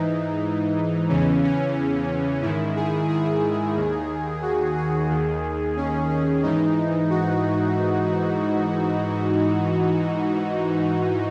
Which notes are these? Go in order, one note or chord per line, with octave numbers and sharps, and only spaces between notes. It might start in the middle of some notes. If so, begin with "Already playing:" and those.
Already playing: G#2 E3 D#4
E2 C#3 E3 C#4
C#4
G#2 D#3 E4
G#4
G#4
D#2 D#3
F#4
G#4
D#2 D#3
C#4
C#4
G#2 E3 D#4
F#4